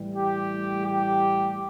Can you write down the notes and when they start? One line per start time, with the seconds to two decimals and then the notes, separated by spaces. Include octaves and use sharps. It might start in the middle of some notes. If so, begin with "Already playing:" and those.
Already playing: A2 E3 G3
0.15 G4
0.85 G4